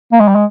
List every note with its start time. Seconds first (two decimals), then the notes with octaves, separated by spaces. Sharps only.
0.13 A#3
0.20 G#3
0.28 G3
0.35 G#3